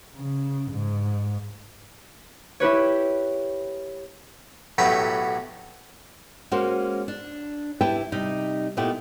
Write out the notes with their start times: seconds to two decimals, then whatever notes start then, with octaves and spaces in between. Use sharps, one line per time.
0.16 C#3
0.72 G#2
2.60 E4 G4 B4 C#5
4.78 B1 A2 F#3 A3 G4 B4
6.51 G#3 A#3 C#4 F#4 C5
7.08 D4
7.81 E4 G4 B4 E5 G5 A5
8.12 C3 G3 D#4
8.77 A#2 A3 B3 D#4 E4 G4